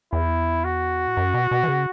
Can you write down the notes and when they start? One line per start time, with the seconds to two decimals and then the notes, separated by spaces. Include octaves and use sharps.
0.13 E2 E4
0.64 F#4
1.07 A2
1.17 F#2
1.34 B2
1.51 B2
1.63 E3
1.68 C#3